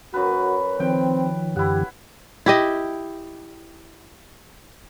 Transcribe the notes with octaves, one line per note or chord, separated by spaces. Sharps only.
F#2 F#4 B4
D#3 F3 C4 G5
F#2 D3 E3 E4 G4 F#5
E4 G4 D#5